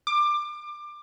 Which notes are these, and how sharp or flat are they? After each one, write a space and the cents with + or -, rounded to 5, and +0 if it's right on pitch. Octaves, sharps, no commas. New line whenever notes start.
D6 +25